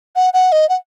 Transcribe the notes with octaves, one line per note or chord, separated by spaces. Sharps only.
F#5
F#5
D#5
F#5